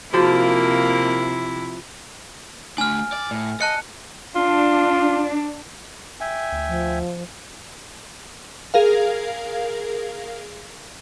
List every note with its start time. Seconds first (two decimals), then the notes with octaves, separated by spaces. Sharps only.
0.14 C3 F3 A#3 E4 F#4 G#4 A5
2.78 A3 D4 G#5 F6
3.12 D5
3.31 A2
3.61 D#5 A5 F#6 C#7
4.35 D4 F4
6.21 E5 G5 G#5
6.52 D2
6.68 F3
8.74 G#4 A#4 F5